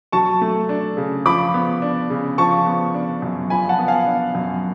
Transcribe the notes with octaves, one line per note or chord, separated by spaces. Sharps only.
F#3 A5 C#6
A3
D4
C#3
F3 B5 D6
B3
D4
C#3
F3 A5 C#6
B3
D4
F#2
F3 G#5 B5
F#5 A5
B3
F5 G#5
D4
F#2